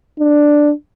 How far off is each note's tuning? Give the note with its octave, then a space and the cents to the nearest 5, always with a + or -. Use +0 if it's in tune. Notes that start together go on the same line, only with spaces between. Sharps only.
D4 +5